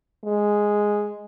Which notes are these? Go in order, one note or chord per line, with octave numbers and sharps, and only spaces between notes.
G#3